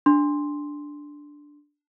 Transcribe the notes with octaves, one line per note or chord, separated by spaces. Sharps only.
D4 C6